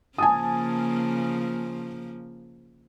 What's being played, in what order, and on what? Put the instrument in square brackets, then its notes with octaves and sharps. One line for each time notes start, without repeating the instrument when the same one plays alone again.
[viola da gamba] C#3 F3 A#3 [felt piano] G#5 A5 D#6